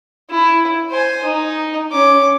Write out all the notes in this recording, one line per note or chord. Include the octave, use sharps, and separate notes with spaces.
E4
C5 G#5
D#4
C#4 D6